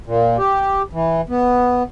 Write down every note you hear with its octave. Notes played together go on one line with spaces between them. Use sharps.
A#2
G4
E3
B3